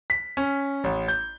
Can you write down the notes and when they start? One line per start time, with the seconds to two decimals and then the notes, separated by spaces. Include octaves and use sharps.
0.10 B6
0.37 C#4
0.84 A1
1.08 G6